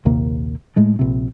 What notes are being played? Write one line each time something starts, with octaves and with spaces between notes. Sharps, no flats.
A#1 D#2 C3 A#3
A2 G#3 A3
A#1 C3